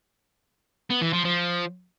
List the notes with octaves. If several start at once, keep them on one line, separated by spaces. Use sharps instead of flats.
B3
E3
F3
F3